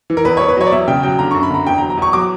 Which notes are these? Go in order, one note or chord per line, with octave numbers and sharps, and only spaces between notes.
E3
A#4
E2 B4
E2 C#5
B4
F#3 C#5
D5
E2 E5
C#3 G5
F#3 G5
D3 A#5
F#2 C#6
B5
D3 A#5
E2 G5
A#5
F#3
A#5
E2 C#6
F#3 D6